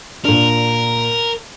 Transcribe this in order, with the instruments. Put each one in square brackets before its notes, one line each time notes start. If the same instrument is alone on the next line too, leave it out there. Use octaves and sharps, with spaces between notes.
[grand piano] A#2 D4 [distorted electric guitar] A#4